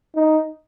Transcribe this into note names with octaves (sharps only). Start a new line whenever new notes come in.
D#4